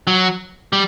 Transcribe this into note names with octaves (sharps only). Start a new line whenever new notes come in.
F#3
G3